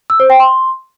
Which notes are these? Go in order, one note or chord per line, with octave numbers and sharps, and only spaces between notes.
E6
C5
G5
C6